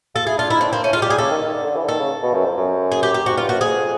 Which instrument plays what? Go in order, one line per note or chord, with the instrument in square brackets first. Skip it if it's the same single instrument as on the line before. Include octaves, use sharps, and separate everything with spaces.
[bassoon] F4 [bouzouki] A4
[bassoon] E4 [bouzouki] G#4
[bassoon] D4 [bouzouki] F4
[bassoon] D#4 [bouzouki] E4
[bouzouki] C4 [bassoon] D4
[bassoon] A#3 [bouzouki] C4
[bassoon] A3 [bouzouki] C#4
[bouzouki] F4
[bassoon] G#3
[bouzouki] G4
[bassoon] G3 [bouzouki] G#4
[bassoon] C#3 [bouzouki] A4
[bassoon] D#3
D#3
D3
D3
E3
D3
[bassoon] D#3 [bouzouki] A4
[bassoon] C#3
B2
F#2
F2
F#2
[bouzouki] G#4
G4
G4
[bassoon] G#2 [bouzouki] F#4
[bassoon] G2 [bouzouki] F4
[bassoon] F#2 [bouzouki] F#4
[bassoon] F2 [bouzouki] G#4